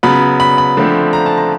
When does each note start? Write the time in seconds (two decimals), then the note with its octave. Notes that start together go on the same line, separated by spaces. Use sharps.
0.03 C#3 F#3 B3 B5
0.40 B5
0.58 B5
0.77 D3 F3 A3 C4
1.13 A#5
1.26 A5
1.38 A#5